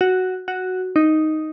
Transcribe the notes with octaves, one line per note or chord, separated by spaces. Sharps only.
F#4
F#4
D#4